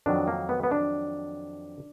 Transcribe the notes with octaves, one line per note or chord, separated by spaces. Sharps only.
F2 D#3 F#3 D4
A#3
B3
B3
D4